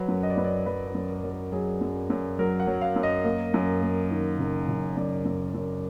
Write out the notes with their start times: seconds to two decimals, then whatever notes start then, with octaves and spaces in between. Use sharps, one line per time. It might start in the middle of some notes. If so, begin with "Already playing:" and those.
Already playing: F#3 B4
0.08 F#2
0.23 D#5
0.30 D5
0.37 F#2 B4
0.44 D5
0.66 F#3 B4
0.88 B4
0.95 F#2
1.09 A#4
1.24 F#3
1.30 A#4
1.52 F#3 G#4
1.81 F#2
2.10 F#2
2.39 F#3 A#4
2.60 F#5
2.67 F#3
2.81 F5
2.96 F#2
3.03 D#5
3.24 A#3
3.54 F#2
3.82 A#3
4.11 D#3
4.39 F#1
4.68 F#1
4.97 F#2 D5
5.25 F#2
5.54 F#2